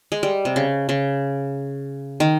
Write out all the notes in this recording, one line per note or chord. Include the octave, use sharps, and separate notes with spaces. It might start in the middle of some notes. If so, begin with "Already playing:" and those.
G#3
G3
C3
C#3
C#3
D#3